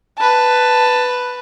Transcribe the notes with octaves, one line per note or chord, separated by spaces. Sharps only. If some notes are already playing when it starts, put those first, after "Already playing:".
B4 A5